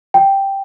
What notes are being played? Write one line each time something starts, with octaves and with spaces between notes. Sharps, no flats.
G5